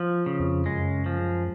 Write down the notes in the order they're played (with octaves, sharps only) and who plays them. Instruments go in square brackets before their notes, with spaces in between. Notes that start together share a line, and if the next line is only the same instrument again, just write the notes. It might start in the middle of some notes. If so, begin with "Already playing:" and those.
Already playing: [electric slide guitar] F3
C#3
[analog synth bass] F2
[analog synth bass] F#2 [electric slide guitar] G#3
[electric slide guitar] F3